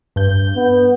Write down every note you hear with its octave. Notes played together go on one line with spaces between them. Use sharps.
G2 G6
B3